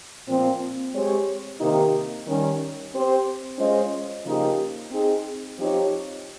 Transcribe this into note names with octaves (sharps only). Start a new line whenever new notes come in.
A#2 F3 C4
G#3 C4 G4 C#5
C3 D#3 A#3 D#4 G4
D#3 G3 C#4
C4 G4 C5
G#3 C#4 F4 C5 D#5
C#3 F3 A#3 D#4 G4
C4 D#4 G#4
F3 C4 D#4 G4 C#5